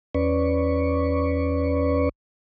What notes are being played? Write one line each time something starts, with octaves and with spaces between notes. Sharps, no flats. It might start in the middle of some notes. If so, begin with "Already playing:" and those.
E2 C#4 B4 D5 C#6